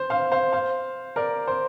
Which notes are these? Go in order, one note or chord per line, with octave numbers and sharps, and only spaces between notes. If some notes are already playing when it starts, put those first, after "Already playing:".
Already playing: C5
C5 F5
C5 F5
C5 F5
A#4 D5
C5